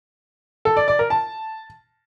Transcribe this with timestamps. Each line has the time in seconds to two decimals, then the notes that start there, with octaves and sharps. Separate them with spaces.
0.65 A4
0.77 D5
0.88 D5
0.99 A#4
1.10 A5